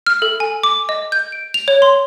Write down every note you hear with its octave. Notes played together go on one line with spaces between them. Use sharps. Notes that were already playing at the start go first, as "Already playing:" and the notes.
F6
A4
G#5
D6
D#5
G6
D7
F7
C#5
C6